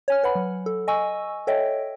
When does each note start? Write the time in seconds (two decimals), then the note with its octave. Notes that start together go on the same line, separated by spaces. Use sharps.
0.08 C#5 G#5 F6
0.23 B4 F#5 B5
0.35 F#3
0.66 A4
0.88 D#5 G#5 C#6 E6
1.47 A4 C#5 D#5 E5 G5